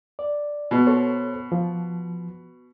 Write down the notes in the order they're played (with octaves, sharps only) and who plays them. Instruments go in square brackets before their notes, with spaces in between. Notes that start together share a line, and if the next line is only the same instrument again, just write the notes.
[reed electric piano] D5
[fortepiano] B2
[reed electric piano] A4 C5 C#5
F3